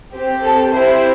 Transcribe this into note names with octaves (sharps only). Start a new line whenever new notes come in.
C4 G4
A4
C4 E4 G4 C5